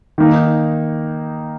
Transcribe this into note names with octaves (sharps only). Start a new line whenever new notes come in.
D#3 A#3 D#4